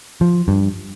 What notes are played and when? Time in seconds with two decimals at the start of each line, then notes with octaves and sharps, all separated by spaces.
0.21 F3
0.48 G2